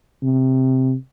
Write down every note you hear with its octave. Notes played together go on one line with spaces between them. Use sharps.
C3